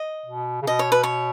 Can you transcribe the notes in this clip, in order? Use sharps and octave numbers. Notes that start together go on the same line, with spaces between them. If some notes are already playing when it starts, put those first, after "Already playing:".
Already playing: D#5
B2
C#3
B2 D#5
C#5
B4
C#5